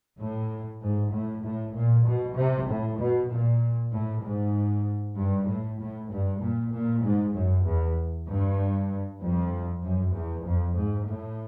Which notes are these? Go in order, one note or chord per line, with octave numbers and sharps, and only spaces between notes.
A2
G#2
A2
A2
A#2
B2
C3
A2
B2
A#2
A2
G#2
G2
A2
A2
G2
A#2
A#2
G#2
F#2
E2
G2
F2
F#2
E2
F2
G#2
A2